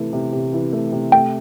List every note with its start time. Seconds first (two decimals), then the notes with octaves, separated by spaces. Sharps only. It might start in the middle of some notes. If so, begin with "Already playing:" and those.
Already playing: C3 E3 A3
0.13 C3
0.33 C3
0.53 E3
0.73 A3
0.93 C3
1.12 A3 G5